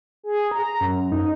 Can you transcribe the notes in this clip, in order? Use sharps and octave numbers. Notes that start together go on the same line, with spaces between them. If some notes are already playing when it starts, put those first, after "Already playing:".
G#4
A#5
F#2
D#4